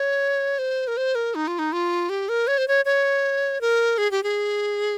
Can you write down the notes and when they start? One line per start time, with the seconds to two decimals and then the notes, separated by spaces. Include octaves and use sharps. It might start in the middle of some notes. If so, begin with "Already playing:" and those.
Already playing: C#5
0.59 C5
0.87 A#4
0.97 C5
1.15 A#4
1.35 D#4
1.47 F4
1.59 D#4
1.73 F4
2.09 G4
2.29 A#4
2.47 C#5
2.58 C5
2.68 C#5
2.85 C#5
3.61 A#4
3.98 G#4
4.11 G4
4.23 G#4